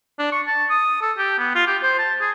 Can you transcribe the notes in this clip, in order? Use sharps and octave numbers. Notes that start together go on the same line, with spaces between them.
D4
C#6
A5
D#6
A4
G4
B3
F4
G4
C5
A5
G#4